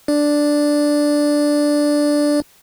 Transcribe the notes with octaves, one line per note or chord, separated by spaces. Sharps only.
D4 D5